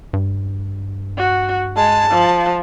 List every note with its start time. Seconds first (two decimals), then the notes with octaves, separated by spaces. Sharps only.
0.13 G2
1.17 F#4
1.76 G#3 A5
2.10 F3